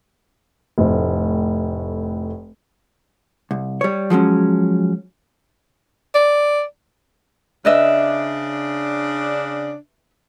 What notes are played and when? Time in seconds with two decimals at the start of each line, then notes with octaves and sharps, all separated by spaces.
0.78 F1 A2 C4
3.51 C2
3.81 G3 C#5
4.10 F3 F#3 G#3 C#4
6.15 D5
7.65 C#3 D4 B4 D#5 E5